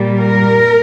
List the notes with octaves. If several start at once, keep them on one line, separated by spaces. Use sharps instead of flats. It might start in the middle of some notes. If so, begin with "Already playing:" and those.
Already playing: A#2 G3
A#4